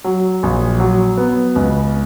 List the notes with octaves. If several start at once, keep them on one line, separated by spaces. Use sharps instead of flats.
F#3
A#1
F#3
B3
C#2